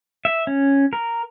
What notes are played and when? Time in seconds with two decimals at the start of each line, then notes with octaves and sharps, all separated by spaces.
0.25 E5
0.47 C#4
0.93 A#4